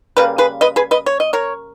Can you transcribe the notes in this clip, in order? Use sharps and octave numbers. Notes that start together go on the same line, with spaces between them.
C#3 G3 A#3 B4
G#4 B4
B4 D#5
G#4 B4
B4 D#5
C#5
D#5
A#4 C#5